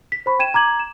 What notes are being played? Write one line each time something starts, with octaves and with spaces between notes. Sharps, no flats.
B6
C5 B5 C#6
G5 G#6 D#7 E7
A#5 D6 G#6 F#7
E7